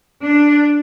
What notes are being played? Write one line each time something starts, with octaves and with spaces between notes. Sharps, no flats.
D4